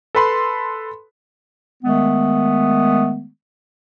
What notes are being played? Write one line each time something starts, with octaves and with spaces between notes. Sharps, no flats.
A4 B4 B5 C6
D#3 G#3 A3 B3